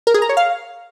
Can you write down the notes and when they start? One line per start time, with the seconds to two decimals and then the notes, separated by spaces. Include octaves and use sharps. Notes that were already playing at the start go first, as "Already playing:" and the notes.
0.07 A#4
0.14 G#4
0.22 A#5
0.29 C#5
0.37 F5